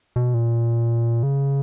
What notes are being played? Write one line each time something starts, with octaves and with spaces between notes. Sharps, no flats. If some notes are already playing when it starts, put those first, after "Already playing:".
B2
A#2
C#3